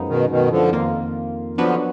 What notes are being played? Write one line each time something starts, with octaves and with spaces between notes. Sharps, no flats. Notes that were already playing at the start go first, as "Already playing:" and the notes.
Already playing: F#2 F3 G#3 B3 D#4
B2 D#3
B2 D#3
D3 F3
F2 D#3 A#3 F4
D3 F3 F#3 B3 D4 F#4 B4